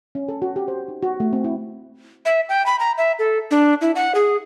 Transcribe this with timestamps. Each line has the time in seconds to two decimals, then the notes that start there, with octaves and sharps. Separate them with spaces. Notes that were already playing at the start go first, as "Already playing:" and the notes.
0.15 C#4
0.28 A4
0.42 F#4
0.56 G4
0.68 C5
0.88 D#4
1.02 F#4
1.20 A3
1.33 C4
1.44 E4
2.25 E5
2.49 G5
2.66 B5
2.79 A#5
2.98 E5
3.19 A4
3.51 D4
3.81 E4
3.95 F#5
4.15 G#4